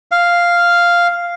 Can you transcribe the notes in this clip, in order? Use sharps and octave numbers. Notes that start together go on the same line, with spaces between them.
F5